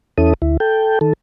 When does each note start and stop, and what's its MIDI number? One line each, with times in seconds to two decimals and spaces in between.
0.18 0.34 40
0.18 0.34 61
0.18 0.34 64
0.18 0.34 69
0.18 0.34 87
0.42 0.57 38
0.42 0.57 64
0.60 0.99 69
0.60 0.99 79
1.01 1.13 51
1.01 1.13 69